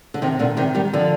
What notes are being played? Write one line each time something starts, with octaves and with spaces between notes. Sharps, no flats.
D3
C3 D#3
A#2 D3
C3 D#3
D#3 G3
D3 F3